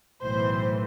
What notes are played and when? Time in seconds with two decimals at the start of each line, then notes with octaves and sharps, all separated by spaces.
0.22 B1 A2 E3 C5